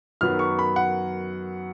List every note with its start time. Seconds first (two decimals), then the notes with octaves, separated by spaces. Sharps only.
0.21 F#2 D#3 F#3 B3 F6
0.39 C#6
0.59 B5
0.76 F#5